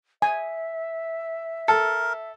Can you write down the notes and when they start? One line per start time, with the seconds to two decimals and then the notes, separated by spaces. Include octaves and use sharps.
0.22 E5 G#5
1.68 A4 A#4